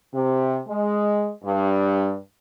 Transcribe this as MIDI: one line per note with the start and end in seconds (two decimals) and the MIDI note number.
0.13 0.59 48
0.67 1.29 56
1.43 2.14 43